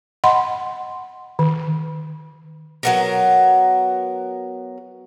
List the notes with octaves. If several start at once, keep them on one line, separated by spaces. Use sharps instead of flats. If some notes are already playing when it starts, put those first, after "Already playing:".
D#5 F#5 B5 C6
D#3
F#3 B3 A#4